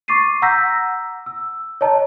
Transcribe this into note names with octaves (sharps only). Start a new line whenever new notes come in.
C#6 D6 A6 C7 D#7
F#5 A#5 E6 G6 A#6 B6
E6
C#5 D#5 A5 A#5